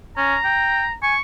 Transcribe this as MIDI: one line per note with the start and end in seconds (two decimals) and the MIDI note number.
0.17 0.36 61
0.17 0.94 82
0.44 0.85 79
1.03 1.15 80
1.03 1.21 85